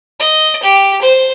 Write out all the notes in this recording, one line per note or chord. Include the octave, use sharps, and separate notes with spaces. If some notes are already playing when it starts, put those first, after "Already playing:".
D#5
G4
C5